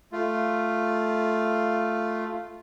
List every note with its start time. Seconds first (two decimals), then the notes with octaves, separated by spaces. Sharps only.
0.12 A3 F4